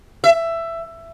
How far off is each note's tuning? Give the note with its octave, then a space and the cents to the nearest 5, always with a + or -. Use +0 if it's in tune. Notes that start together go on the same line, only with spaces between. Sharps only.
E5 +15